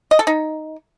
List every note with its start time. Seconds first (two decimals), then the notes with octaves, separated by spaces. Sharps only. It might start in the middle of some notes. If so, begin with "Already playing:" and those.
0.11 D#5
0.19 A4
0.27 D#4